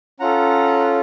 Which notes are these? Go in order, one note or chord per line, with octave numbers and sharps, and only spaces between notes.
C#4 F4 A4 F#5 A#5